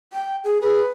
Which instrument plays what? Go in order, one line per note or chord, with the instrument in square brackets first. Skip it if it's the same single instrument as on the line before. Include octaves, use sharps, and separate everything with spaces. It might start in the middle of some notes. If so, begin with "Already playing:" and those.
[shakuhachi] G5
G#4
[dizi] G#4 [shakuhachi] B4